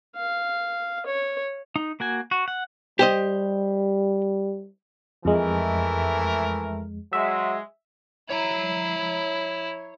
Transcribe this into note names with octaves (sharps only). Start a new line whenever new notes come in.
F5
C#5
D#4
A#3 F#4 G#5
F#4
F#5
G3 G4 C5 D#5
F2 E3 G#3 A3 A#4
F#3 G#3 E5
E4 C#5 A#5